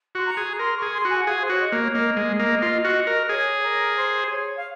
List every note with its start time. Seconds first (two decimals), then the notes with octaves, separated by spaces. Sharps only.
0.15 F#4 C6
0.26 A#5
0.37 G#4
0.59 A#4 C6
0.77 C#6
0.82 G#4
0.93 C6
1.05 F#4 G#5
1.19 F#5
1.27 G#4 F5
1.41 C5
1.49 F#4 C#5
1.61 D#5
1.72 A#3
1.83 C#5
1.94 A#3 D#5
2.17 G#3
2.39 A#3
2.62 F4
2.85 F#4
3.07 A#4
3.29 G#4 C#5
3.64 A#4
3.97 C5
4.30 C#5
4.57 F5